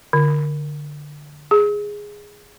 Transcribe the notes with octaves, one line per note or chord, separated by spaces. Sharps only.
D3
G#4